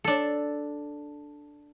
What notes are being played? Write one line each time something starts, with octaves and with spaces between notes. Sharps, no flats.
D4 A4